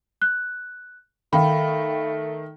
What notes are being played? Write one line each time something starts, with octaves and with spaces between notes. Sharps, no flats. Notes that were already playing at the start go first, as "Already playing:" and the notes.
F#6
D#3 A3 F5 G5 B5